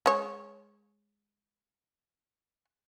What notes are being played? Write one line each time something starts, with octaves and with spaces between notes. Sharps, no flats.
G#3 C#5